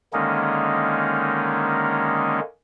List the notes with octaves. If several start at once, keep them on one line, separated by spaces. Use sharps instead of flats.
D3 D#3 G#3 A#3 C#4 D#4